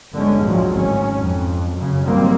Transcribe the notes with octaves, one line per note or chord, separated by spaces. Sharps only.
G1 D3 G#3 C#4
D2 A2 F3 F#3 G#3
G#1 F#3 C#4
F2
F#2 C#3
G#1 D#3 F#3 G3 A#3 C4